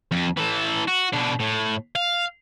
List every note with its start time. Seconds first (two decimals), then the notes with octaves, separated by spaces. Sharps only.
0.12 F2
0.37 E3 A4
0.87 F#4
1.13 B2 D4
1.40 A2
1.95 F5